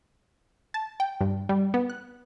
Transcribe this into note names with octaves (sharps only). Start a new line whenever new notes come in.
A5
G5
G2
G3
B3
F#6